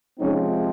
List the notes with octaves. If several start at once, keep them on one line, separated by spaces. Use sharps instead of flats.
C3 F3 G#3 C4 C#4 D#4